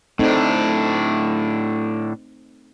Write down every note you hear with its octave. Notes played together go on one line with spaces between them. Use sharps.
A2 A3 C4 D4 D#4